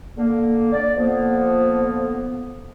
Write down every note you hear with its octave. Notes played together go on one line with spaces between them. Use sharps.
D3 A#3
D5
D3 F3 A#3 B3